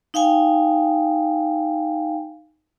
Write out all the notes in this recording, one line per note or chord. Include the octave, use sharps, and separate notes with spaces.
D#4 F5 G5 G#5